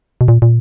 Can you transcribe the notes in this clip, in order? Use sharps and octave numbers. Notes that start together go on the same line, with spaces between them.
B2
A#2
A#2